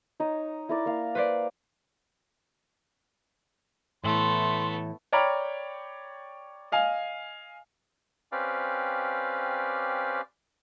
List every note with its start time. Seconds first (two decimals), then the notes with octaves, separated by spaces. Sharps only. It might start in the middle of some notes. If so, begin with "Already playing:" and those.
0.20 D#4 C#5 D#5
0.69 E4 A#4 D5
0.86 A#3 F5
1.15 B4 C5 D5
4.04 A2 E3 A3 B3 E5 C6
5.12 C#5 D5 G5 A#5 B5 F6
6.72 D#5 F5 G#5
8.32 C4 C#4 G4 B4 D5 F5